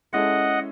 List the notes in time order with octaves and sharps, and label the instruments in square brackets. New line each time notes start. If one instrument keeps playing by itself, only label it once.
[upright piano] G#3 C#4 E4 A4 [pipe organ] D#5 F#5